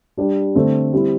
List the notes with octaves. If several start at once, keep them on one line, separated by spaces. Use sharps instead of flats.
G3 D4 G4
D3 A3 C4
G3 C4 E4